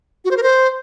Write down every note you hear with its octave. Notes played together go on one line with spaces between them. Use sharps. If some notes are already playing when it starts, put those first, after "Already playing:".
F#4
C5
A#4
C5